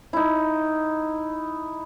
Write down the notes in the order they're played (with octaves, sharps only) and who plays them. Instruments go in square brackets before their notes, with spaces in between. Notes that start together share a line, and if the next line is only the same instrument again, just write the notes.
[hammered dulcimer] D#4 E4